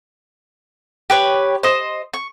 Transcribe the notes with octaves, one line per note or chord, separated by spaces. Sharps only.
G4 B4 C#5
C5 D#5
C#6